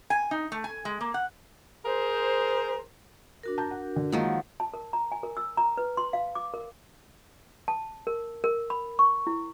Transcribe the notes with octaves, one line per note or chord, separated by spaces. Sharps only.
G#5
D#4
A3
G#5
G#3
A#3
F#5
G#4 A#4 C5
D4 F#4 A#4
A5 A#5 G6
F#5
D3
D#3 F3 F#3 G#3 A#3
A5
A#4
A#5
G#5
A#4
E6
A#5
B4
C6
F5
D6
A#4
A5
A#4
A#4
B5
C#6
E4